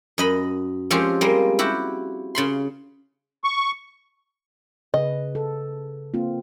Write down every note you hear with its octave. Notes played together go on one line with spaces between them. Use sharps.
F#2 D#5 B5
F3 G#3 C4 C#4 F4 G4
G3 G#3 A#3
E4 F#4 G4
C#3 B5 C6
C#6
C#3 G#4 B4 D#5
A4
A#3 C4 F4